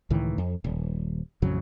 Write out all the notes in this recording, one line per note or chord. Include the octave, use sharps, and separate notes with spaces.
C#2 A2 D#3 E3
F2
D#1
A1 F2 C#3 F#3